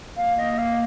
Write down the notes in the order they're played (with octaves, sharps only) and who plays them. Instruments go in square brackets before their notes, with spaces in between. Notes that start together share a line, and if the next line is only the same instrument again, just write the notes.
[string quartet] A#3 [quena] F5
[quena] D#5
F5